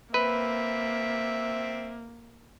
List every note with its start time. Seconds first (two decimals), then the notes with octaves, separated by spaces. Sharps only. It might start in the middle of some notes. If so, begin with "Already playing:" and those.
0.14 A#3 C4 B4 E5